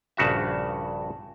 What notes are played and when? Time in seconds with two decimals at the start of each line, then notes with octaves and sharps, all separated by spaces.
0.17 A#1 G2 C#3 F#4 E5